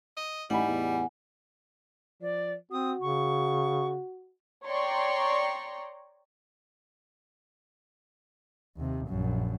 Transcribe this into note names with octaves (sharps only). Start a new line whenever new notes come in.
D#5
A1 A2 G3 D#4 F#5 G#5 B5
E2
F3 D5
C4 F#4 D#6
C#3 C#6
C#5 D5 G5 A#5 C6 C#6
D#2 C3
A#1 F#2